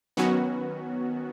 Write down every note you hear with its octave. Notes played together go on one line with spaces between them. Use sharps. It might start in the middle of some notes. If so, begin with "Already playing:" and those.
D#3 F#3 B3 C#4 F#4